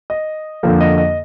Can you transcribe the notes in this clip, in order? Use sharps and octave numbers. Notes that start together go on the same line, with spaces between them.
D#5
F2 D3 F3 A#3
D#5
D#5